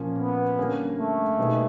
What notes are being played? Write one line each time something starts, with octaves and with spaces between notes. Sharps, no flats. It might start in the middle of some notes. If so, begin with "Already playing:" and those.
Already playing: A#2 F3 A#3 C#4
B3
D3 G3 A#3 C#4
A3
B2 G3 A#3 D#4 G#4